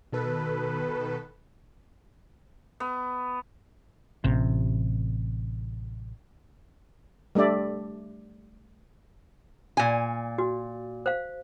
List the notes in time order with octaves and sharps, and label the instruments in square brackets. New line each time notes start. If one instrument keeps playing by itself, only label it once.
[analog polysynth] B2 D#3 A4 B4
[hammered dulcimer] B3
[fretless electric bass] A1 C3
[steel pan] G3 A3 D4 D5 E5
[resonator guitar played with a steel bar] A#2 G#5
[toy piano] F#4
C5 F5